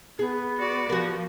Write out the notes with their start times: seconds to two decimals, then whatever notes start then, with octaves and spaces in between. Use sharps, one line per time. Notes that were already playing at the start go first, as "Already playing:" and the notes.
0.19 B3 G#4
0.57 F#4 D5
0.90 F3 F#4 G4 A#4